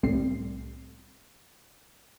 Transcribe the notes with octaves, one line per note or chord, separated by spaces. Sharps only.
C2 A2 G3 C4 C7